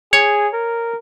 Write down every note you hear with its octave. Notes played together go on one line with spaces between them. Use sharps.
G#4 C#5
A#4